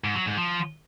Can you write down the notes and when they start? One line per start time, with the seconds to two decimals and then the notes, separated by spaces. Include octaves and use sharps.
0.04 G#2
0.15 F#3
0.26 G#2
0.38 F3